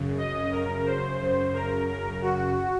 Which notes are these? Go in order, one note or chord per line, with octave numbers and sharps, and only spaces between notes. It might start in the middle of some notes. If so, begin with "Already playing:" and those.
Already playing: F#2 C#3
D#5
A#4
C5
F#2 C#3
A#4
A#4
F#4